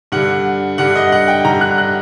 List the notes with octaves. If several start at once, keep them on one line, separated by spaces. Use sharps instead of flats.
G2 D3 F#5
G2 D3 F#5
D#5
F#5
G5
G2 D3 A#5
F#6
F#6